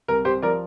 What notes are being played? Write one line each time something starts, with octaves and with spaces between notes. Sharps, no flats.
C2 A#4
C2 G4 C5
F3 A#4 D5